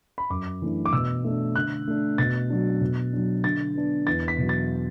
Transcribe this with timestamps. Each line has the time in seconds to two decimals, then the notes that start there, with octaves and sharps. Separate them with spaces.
0.18 B5
0.30 F#2 D6
0.62 E3 A3 D4
0.85 D6
0.93 B2 E6
1.24 A3 D4
1.55 D3 F#6
1.88 A3 D4
2.18 B2 A6
2.50 F#3 D4
2.81 B2
3.13 F#3 D4
3.44 D3 A6
3.75 B3 D4
4.07 E2 A6
4.28 B6
4.38 B2 F#3
4.49 A6